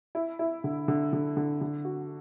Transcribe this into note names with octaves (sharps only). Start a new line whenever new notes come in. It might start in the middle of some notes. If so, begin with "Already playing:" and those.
E4
E4
D3
D3
D3
D3
D3
F#4